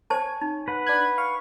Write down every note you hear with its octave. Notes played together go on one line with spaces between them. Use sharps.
C5 C#5 G#5 A5
D#4
B4 F#5
D4 F#6 G#6
F5 C#6